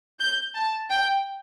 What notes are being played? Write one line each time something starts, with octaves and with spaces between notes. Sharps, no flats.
G6
A5
G5